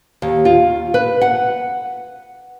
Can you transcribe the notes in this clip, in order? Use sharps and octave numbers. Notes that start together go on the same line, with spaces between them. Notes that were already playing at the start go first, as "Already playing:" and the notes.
D#2
F4
B4
F#5